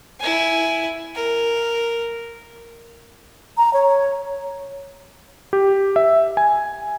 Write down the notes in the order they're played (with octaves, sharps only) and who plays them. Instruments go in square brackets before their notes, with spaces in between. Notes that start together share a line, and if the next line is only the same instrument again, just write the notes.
[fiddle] E4 G#5
A#4
[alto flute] A#5
C#5
[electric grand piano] G4
E5
G#5